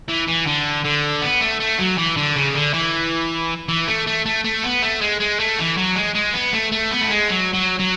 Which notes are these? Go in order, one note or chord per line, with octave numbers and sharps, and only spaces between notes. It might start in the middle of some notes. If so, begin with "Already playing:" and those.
E3
E3
D3
D3
B3
A3
A3
F#3
E3
D3
C#3
D3
E3
E3
A3
A3
A3
A3
B3
A3
G#3
G#3
A3
E3
F#3
G#3
G#3
B3
A3
A3
B3
A3
G#3
F#3
F#3
F#3